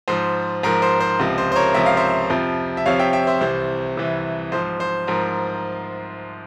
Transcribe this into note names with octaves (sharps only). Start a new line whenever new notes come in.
G#2 F3 C5
G#2 F3 A#4
C5
C5
C#2 C3 F3
C5
C5
A#4 C#5
C#2 C3 F3 E5
F5
C5 E5
F2 C3 F3
E5
F2 C3 F3 C#5 F5
E5 G5
E5 G5
C5 E5
C2 C3 E3 C5
C2 C3 E3
G#2 F3 C5
C5
G#2 F3 A#4